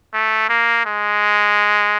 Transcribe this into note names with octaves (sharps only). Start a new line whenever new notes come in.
A3
A#3
G#3